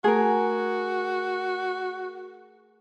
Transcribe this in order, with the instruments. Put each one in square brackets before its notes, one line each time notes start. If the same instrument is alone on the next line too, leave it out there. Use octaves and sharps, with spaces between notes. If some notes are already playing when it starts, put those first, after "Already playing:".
[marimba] A3 [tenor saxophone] F#4 [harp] G#4 A#4